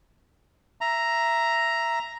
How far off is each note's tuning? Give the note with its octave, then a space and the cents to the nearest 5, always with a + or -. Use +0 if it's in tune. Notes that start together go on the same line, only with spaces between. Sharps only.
E5 +15 A#5 +5